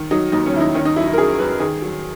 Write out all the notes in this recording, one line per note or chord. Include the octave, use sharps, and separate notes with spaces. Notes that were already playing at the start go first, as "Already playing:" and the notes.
Already playing: D#3
F#3 D#4
D#2 D#4
C#4
D#2 E4
D#4
D#3 C#4
D#4
F#3 E4
E4
A#4
F#2 G#4
F#2 B4
D#3 G#4
F#3